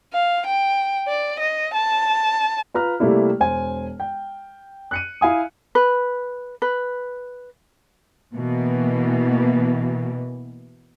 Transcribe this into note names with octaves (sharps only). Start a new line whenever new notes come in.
F5
G5
D5
D#5
A5
F4 B4 A#5 F6
C3 G3 A3 A#3 E4
E1 C5 G#5
G5
F#6 C#7 D#7
E4 F5 G#5 D#6
B4
B4
B2 E3 A#3